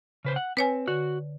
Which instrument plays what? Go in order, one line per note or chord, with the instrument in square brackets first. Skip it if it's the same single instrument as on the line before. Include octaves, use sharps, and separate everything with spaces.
[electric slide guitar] C#3 B4 C5
F#5
[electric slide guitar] C4 [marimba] B4 C#5 G#5
[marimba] D3 [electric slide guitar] F#4